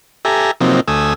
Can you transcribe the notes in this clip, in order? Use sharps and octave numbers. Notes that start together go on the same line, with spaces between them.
G4 A4 E5 G#5 A#5
C3 F3 F#3 A#3 C4 D#4
D2 A3 G#5 D#6 E6